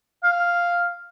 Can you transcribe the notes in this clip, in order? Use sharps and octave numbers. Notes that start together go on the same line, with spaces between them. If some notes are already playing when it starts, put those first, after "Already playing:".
F5